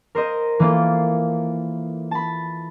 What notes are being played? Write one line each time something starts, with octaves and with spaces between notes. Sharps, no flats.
A#4 C5 D#5
E3 A#3 F4 A4
A5 B5